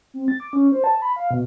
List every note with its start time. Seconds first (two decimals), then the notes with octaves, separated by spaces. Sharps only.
0.14 C4
0.28 A6
0.40 D6
0.53 C#4
0.72 C5
0.84 A5
1.02 B5
1.16 F5
1.31 B2